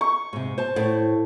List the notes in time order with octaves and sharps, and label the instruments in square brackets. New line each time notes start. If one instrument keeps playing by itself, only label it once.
[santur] C#6
[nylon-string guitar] G#2 C3
C5 A5
[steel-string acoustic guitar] A2